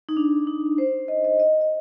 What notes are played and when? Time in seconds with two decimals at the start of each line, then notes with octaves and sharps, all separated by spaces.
0.09 D#4
0.17 D4
0.47 D#4
0.78 C5
1.08 D#5
1.25 D#5
1.40 D#5
1.61 D#5